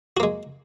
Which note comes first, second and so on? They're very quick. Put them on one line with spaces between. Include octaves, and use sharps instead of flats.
F#4 A#3 G#3